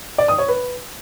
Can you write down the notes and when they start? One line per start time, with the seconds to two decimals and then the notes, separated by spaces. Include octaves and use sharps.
0.18 D5
0.28 D#6
0.38 C#5
0.48 B4